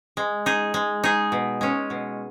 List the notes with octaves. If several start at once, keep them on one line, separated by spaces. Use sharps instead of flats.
G#3
D#4 G#4
G#3
D#4 G#4
B2
G#3 C#4
B2